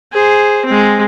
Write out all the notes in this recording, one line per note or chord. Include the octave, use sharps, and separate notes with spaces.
G#4 C5
G#3 C4